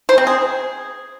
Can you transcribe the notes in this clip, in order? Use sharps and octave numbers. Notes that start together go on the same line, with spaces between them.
C5
C4
G#4